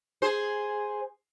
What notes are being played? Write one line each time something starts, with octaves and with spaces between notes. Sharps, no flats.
G#4 C5